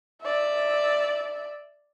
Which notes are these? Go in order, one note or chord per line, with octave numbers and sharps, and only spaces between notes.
D5 E5